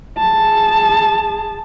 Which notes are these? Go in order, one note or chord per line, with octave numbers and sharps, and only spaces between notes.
G#4 A5